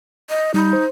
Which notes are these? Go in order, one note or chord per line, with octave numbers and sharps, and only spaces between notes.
D#5
G3 D#4 B5
C5